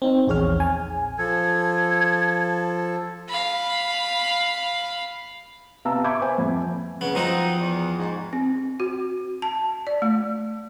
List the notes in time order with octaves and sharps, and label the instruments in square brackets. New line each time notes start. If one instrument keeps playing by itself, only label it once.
[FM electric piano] C4 D#4
A#1 E2 G#4 C#5 F6
G#5
[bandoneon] F3 A4 [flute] G#6
[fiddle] F5 B5
[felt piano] C3 B3 F5 A5 A#5 E6
E5 B5 C#6 D6 G6 G#6
B4 C5 G#5
F2
[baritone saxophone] C#3 [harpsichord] B3
[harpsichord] F3 C4 F#4 [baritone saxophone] D#4
[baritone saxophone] E2
G#2
[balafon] C4
F#4
A5
D5
A3